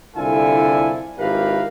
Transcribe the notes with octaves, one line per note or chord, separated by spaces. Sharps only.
C2 D3 E4 F4 A4 G#5
G#1 E4 G4 A#4 B4 F5